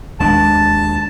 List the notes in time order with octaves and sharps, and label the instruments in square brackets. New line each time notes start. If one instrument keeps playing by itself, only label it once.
[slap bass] D#2 G#3 D4 [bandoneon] A5